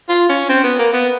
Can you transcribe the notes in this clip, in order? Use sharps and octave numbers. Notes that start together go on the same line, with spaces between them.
F4
C#4
C4
B3
A#3
B3